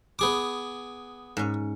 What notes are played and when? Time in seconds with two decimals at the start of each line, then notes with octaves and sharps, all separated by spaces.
0.19 B3 G#4 D6
1.37 G#2 C#4